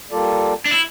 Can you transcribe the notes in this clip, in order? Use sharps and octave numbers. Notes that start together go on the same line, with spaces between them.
G3 A#3 F4 A4 D5
D4
E4